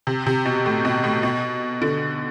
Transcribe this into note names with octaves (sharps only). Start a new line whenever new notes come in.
C3
C3
B2
A2
B2
A2
B2
D3